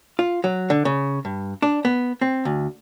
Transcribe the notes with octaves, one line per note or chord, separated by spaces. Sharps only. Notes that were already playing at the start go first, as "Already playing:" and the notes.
F4
F#3
D3
C#3
G2
D4
B3
C4
D2